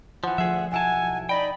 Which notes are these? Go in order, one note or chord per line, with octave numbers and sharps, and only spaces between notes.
E3 F3 F#5
D2 F3 G#4 E5
B1 E4 F#5 G#5 A5
D#4 D5 D#5 G5 B5